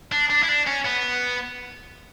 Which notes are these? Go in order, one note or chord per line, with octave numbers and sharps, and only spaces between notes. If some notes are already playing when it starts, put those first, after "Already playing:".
D4
D4
E4
D4
C#4
B3